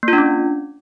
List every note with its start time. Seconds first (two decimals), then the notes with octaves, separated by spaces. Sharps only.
0.03 A#3
0.08 F4
0.13 D4
0.18 C#4